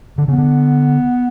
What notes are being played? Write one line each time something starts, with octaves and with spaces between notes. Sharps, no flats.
D3
C#3 B3
D3